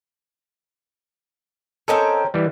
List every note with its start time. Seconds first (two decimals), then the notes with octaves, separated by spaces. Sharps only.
1.88 C4 C#4 A4 A#4 D#5
2.34 E3 G3